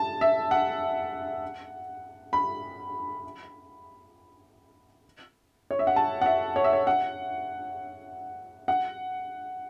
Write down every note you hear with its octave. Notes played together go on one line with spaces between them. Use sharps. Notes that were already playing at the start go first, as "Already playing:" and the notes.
Already playing: A5
E5
F#5
B5
C#5
E5
F#5
A5
F#5
E5
C#5
E5
C#5
F#5
F#5